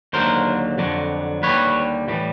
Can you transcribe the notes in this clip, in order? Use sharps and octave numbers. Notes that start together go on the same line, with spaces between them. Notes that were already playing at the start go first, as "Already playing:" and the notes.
D#2 D3 F#3 A#4 C5
F2 D3 F#3
D#2 D3 G3 B4 C#5
A2 E3 G3